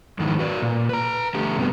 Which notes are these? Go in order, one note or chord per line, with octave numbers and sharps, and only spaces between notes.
F2 G#2 D#3 E3
F#4 B4 D5
A#2
B4 A#5
D3 A3 G4
G2 C3 B3